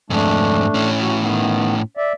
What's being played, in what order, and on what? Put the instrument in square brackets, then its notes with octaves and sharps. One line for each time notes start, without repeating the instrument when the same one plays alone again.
[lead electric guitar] F2 G#2 [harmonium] A3 D4
[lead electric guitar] A2 C#4
[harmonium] F#4
D#3 B3
D5 E5